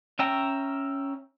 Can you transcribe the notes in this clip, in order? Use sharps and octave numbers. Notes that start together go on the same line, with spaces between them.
C#4 E5 G5 A#5